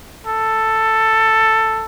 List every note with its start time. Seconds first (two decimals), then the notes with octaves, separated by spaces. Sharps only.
0.27 A4